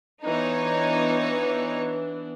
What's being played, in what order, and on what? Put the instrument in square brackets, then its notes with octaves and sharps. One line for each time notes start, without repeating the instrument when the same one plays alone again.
[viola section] E3 B3 D4 [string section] D#4 C#5